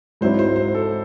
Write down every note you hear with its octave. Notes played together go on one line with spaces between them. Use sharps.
G#2 F#3 C4 E4 C5
C5
C5
A4